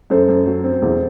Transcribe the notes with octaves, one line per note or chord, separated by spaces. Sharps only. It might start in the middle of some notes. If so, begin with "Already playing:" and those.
F#2 A4 C5
F#2
F#3
C4
E2